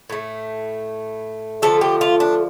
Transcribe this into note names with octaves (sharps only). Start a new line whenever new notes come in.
A2 A3
D3 F3 A3 A4
G4
F4
D4